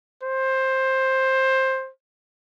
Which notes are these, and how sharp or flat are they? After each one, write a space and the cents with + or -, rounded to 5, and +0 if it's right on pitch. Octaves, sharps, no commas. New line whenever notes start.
C5 +15